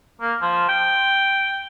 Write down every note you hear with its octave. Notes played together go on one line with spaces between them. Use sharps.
A#3
F3
G5